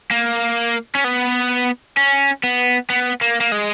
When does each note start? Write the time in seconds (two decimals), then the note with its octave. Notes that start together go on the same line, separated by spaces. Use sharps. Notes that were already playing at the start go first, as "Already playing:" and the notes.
0.11 A#3
0.95 C#4
1.04 B3
1.97 C#4
2.44 B3
2.90 B3
3.21 A#3
3.40 A#3
3.52 G#3